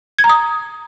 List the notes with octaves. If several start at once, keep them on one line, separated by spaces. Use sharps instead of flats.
G#6
A#5
D#6